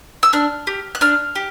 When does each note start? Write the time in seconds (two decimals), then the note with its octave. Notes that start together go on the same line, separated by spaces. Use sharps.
0.23 E6
0.33 D4 F6
0.67 G4
0.95 F#6
1.01 D4 F6
1.35 G4